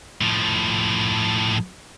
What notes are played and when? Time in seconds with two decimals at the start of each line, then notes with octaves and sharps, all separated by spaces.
0.21 A2 F3